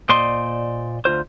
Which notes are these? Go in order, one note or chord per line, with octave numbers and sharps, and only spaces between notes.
A#2 C5 D5 D#5 C6
D2 F4 C5